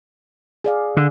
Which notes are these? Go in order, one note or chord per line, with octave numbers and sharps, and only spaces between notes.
G#4 D5 F5
D3